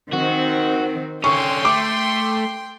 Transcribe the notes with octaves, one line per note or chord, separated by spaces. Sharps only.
D#3 C4 F#4
D3 C#4 G5 C6 C#6
A3 D6